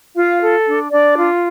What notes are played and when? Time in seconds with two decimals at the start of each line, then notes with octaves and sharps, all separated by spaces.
0.16 F4 F5
0.41 A4
0.67 D4
0.91 D4 D5
1.17 F4